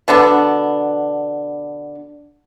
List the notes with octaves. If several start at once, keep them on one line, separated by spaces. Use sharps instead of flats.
B2 D3 B3 D4